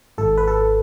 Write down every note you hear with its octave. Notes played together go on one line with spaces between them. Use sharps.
G#1 G#2 A4
B4
A4